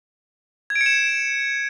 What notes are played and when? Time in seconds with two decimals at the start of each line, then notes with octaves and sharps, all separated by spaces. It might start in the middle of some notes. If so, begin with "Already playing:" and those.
0.70 G#6
0.75 D7
0.81 C#7
0.86 E7